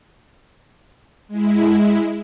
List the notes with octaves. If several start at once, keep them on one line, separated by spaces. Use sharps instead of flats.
G#3 E4